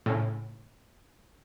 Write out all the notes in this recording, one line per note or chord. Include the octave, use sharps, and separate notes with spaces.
A2 C#3